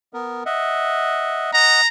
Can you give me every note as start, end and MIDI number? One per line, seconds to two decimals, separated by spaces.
0.13 0.43 59
0.13 0.43 70
0.46 1.51 75
0.46 1.51 76
0.46 1.51 78
1.54 1.81 75
1.54 1.81 78
1.54 1.88 82